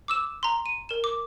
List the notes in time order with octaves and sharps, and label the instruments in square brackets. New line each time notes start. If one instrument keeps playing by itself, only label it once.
[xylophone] D6 E6 E7
A#5 C6
D#7
A#4 E7
D6